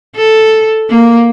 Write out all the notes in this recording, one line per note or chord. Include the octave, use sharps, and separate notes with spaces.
A4
A#3